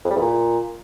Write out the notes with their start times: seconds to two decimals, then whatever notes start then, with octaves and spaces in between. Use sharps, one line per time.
0.05 F2
0.10 G3
0.16 E2
0.21 A#2